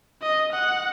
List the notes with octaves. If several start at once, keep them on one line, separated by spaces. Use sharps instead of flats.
D#5
F#5